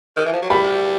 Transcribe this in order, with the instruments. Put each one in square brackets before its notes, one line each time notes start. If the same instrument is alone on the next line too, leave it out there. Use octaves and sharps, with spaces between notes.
[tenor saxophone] D#3
E3
F3
F#3
[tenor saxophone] G3 [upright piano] B5